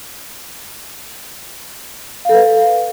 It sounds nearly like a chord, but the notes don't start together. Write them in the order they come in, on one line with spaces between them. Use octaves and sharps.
F5 A4 B4